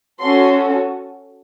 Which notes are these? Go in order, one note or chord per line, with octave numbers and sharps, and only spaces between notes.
C#4 F#4 A4 C6